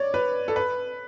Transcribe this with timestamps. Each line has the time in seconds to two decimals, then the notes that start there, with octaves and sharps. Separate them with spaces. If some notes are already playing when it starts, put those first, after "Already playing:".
Already playing: C#5 D5
0.14 B4
0.48 A4
0.56 B4